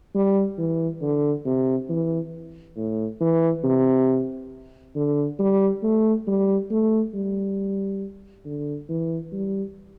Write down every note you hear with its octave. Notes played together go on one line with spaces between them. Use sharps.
G3
E3
D3
C3
E3
A2
E3
C3
D3
G3
A3
G3
A3
G3
D3
E3
G3